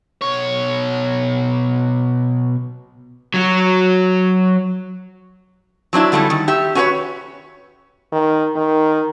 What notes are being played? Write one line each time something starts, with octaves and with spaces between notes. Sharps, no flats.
B2 C#5
F#3 F#4
F#3 C4 D4 E4
D3 G3 A3 C#4 E4
D#3
G4 E5
C#4 F#4 G4 A#4 B4 C#5
D#3
D#3